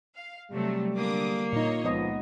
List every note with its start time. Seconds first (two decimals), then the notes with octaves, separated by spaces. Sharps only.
0.16 F5
0.51 C3 F#3 G3 A3
0.97 D3 A#3 D6 D#6
1.53 A#2 D#4 C#5 D#5
1.85 C#2 F3 B3 D#5